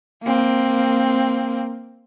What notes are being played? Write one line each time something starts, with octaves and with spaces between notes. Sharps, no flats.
A#3 C4